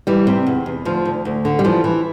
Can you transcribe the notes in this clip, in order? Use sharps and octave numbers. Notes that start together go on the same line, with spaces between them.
E3 G3
C3
E2
E2
D2 F3
D2
D2
D3
G3
E3 F3
E3